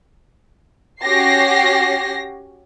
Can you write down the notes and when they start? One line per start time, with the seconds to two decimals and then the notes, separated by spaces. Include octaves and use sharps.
1.02 C#4 F#4 G4 A#6 C7